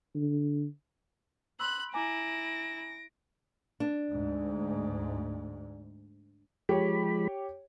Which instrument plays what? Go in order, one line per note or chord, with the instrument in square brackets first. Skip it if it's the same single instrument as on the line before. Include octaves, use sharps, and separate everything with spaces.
[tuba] D3
[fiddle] B5 F#6 [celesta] C6 E6
[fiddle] E4 [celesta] G#5 A#5 D6 [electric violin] A#6 D7
[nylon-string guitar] D4
[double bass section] D2 G#2
[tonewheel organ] F3 G#3 B5 [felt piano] G4 C#5